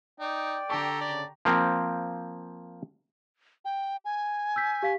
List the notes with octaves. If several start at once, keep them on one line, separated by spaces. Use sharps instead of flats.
D#4 D5 G5
D3 G4 A4 A5 A#5 C#6
C#3 D5
F3 A#3 C4
G5
G#5
E6 G6 B6
G4 F5 B6